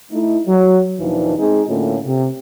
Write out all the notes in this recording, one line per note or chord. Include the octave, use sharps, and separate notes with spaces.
A3 D#4 E4
F#3
D#2 A#2 E3 F3 D4 D#4
G#3 C4 D#4 G#4
A2 D3 A3 A#3 C#4 F4
C3